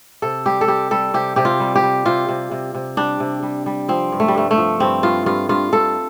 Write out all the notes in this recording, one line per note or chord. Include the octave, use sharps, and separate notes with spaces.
C3 A4
G3 G4
A4
G3 G4
G3 A4
C3 G4
C3 G4
F4
G3
G4
G3
C3 F4
C3
C3
C3
G3 D4
C3
G3
G3
F3 C4
G2
A3
G3
G2 A3
A3
F3
G2 C4
G2 F4
G2 F4
G2 F4
G2 A4